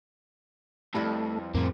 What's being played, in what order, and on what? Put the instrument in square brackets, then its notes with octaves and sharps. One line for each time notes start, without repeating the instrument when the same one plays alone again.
[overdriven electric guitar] F2 [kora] G3 E4 B4 [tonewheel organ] A3
[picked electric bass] F2 A2 [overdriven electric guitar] C#3 A#3 [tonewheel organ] C4